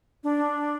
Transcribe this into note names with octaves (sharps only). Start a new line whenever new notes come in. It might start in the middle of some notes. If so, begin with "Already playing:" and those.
D4